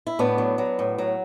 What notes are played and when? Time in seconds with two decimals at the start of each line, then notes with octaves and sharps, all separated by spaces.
0.07 E4
0.19 A2 B3 D4
0.38 F#3
0.58 F#3
0.79 A2
0.98 F#3